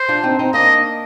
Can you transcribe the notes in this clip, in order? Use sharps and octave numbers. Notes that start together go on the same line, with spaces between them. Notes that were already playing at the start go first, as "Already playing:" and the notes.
Already playing: C5
D4 F4
C4 D#4
C4 D#4
A#3 D4 D#5